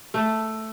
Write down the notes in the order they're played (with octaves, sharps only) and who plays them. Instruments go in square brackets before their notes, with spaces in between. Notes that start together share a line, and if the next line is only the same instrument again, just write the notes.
[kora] A3